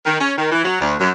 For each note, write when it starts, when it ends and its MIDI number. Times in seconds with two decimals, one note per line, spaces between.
0.06 0.19 51
0.20 0.33 61
0.38 0.49 51
0.52 0.64 52
0.64 0.81 54
0.81 0.95 38
1.00 1.11 42